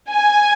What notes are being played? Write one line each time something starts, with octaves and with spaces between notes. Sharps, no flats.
G#5